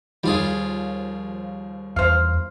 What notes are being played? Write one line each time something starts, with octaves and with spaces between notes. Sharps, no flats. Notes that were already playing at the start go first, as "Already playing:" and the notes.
D#2 F3 G3 F4 G#4
E2 C5 F5